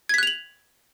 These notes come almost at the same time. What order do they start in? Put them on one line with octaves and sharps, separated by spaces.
G#6 B6 F#6 F7 F#7